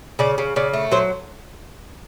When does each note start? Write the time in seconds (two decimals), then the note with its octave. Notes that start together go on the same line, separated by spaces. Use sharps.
0.19 C#3 D5
0.38 C#3
0.56 C#3 D5
0.73 A3
0.92 F#3 C5